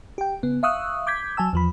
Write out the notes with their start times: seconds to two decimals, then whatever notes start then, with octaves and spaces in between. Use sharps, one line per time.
0.18 G4 G5
0.43 C#3 B3
0.63 E5 F5 C#6 D#6 E6 F#6
1.07 D6 G6 G#6 B6
1.37 F#3 G#5 A5 E6
1.53 E2 F3 B5